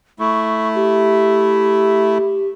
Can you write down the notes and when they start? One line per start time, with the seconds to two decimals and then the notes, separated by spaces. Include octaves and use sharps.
0.19 A3 E4 C#6
0.75 G4